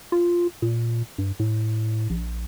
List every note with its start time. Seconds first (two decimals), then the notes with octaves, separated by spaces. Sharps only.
0.12 F4
0.62 A#2
1.18 G2
1.40 A2
2.10 A#1